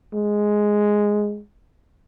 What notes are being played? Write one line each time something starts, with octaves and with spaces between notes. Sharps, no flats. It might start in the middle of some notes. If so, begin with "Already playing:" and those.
G#3